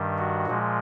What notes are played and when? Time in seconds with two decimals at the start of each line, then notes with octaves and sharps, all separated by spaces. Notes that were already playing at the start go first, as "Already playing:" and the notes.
Already playing: G2 D#3 G3
0.18 F#4
0.47 A#2 F3 G#3